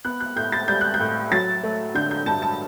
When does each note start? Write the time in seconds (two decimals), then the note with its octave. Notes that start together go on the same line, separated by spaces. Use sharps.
0.05 B3 F#6
0.20 F#6
0.36 A2 G6
0.52 A6
0.68 G3 G6
0.81 F#6
0.94 G6
1.00 A2
1.32 F#3 A6
1.63 A3
1.95 D3 G6
2.11 G6
2.26 G2 A5
2.42 A5